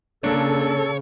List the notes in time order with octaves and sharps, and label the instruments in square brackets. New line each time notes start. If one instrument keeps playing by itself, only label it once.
[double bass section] C#3 [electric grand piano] A#3 D4 [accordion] A4 [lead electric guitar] C#5